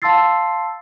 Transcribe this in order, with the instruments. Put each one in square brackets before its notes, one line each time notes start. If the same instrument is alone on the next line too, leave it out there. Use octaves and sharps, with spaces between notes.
[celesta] F5 A5 C6 E6 A6 C7